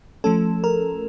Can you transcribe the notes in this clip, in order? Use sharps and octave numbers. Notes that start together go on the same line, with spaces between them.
F3 A3 C#4 A4
A#4